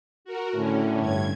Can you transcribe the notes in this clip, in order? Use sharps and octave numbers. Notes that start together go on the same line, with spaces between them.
F#4 A#4
A2 D3 C#4
G2 G#6